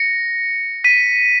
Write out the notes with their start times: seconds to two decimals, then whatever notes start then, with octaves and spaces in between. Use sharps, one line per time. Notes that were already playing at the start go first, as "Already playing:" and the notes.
Already playing: A#6 C#7
0.84 B6 D#7